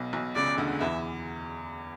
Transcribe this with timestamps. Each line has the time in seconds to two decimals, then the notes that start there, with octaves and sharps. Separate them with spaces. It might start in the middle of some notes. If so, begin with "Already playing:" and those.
Already playing: B1 B2
0.13 B1 B2
0.35 C#2 C#3 D5
0.57 D2 D3
0.80 E2 E3 E5